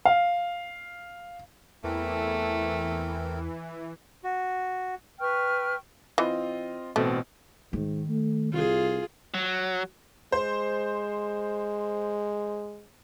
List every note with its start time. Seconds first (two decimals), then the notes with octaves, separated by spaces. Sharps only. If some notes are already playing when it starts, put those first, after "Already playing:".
0.05 F5
1.84 E2 E3 A3 C4 A4 A#4
4.24 F#4
5.20 B4 G5 C#6 F6
6.18 E3 C4 F4 D#5
6.96 A1 B2 A3 C4
7.73 G#2 D#3
8.09 A3
8.53 C2 F4 G#4
9.34 F#3
10.32 G#3 C5